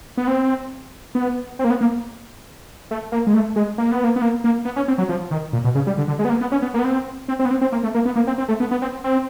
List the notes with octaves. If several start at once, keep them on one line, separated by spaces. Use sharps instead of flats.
B3
C4
B3
C4
A#3
B3
A#3
A3
A#3
G#3
A3
G#3
A#3
B3
A#3
B3
A#3
A#3
B3
C#4
C4
F#3
F3
D#3
A#2
B2
C#3
G3
D3
D3
G#3
B3
A#3
B3
C#4
B3
A#3
B3
C4
C4
C4
B3
C4
C4
A#3
A3
A#3
B3
A#3
C4
C4
A3
B3
B3
C4
C4